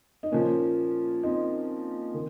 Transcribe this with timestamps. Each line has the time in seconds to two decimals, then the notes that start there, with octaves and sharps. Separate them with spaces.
0.23 D#4
0.32 A#2 F3 A#3 C#4
1.23 C4 D#4
2.14 D#3